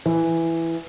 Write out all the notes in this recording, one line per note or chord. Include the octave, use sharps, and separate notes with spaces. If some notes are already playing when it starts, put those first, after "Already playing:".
E3